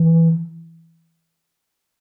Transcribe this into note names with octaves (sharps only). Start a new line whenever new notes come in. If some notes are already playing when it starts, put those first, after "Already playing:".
Already playing: E3